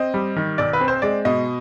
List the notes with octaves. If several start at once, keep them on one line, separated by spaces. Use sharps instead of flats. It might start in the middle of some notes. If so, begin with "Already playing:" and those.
Already playing: C4 D#5
G3
D#3
B1 D5
B4
C4
C5
G#3 D5
B2 D#5